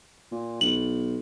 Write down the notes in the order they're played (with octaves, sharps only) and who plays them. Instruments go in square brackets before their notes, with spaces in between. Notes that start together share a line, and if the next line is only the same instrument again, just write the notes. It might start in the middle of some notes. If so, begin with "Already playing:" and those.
[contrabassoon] A#2
[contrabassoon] B1 [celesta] F#7